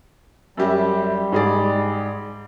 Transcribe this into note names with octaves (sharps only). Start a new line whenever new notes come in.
F#2 G3 G4 E5
G#2 G#4 D5